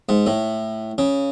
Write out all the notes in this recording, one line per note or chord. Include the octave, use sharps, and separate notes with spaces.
G#2
A2
C#3